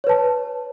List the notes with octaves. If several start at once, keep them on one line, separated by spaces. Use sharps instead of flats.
B4 C#5 A5